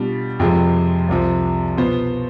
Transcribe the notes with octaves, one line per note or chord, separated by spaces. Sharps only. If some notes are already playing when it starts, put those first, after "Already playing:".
Already playing: B2 G3 D4 F4
F2 C3 F3 G#3
C2 C3 F3
B2 B3 F4 C5